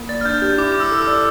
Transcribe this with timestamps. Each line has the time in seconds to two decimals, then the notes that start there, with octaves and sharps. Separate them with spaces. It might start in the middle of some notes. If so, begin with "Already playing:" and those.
Already playing: A#3
0.09 D5 A6
0.21 F6
0.25 D4 G6
0.42 G4
0.58 E4 D6
0.72 E4 D6
0.80 E6
0.91 A4
0.97 E6
1.02 D6
1.07 D5